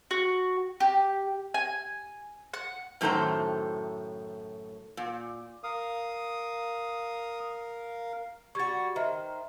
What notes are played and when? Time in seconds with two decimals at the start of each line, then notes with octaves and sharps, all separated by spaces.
0.11 F#4
0.80 G4
1.54 G#5
2.54 F#5
3.01 F#2 A2 D#3 A4 C5 A#5
4.97 A#2
5.64 A#4 F5 D#6
8.55 G3 F#4 C#6 G#6 A6
8.96 D#3 C5 D#5 E5